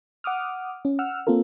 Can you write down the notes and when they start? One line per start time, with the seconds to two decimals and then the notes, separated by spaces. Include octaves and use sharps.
0.24 F#5 D6 D#6 F6
0.85 C#4
0.99 F#5 E6 F6
1.27 A#3 C4 F4 A4 A#4